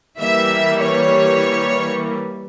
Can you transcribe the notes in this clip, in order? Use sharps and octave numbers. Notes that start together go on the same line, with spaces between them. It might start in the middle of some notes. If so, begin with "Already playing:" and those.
E3 G3 A#3 E5
C#5